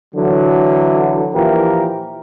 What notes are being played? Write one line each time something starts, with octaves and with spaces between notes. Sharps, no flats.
D3 E3 F#3
A#2 E3 F3 G4 A#4